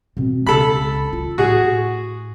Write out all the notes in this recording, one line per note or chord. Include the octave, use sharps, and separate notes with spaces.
B2 C4
C#2 A4 B5
F4
A2 F#4 G#4